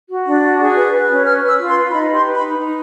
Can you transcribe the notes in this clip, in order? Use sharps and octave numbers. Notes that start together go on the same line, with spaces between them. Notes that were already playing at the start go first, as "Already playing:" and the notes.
F#4
D4
F#4
G#4
B4
B4
C#4
B4 F6
B4 E6
F4
C6
B4
D#4 B5
G4 C6
B4
B5
D#4
D#4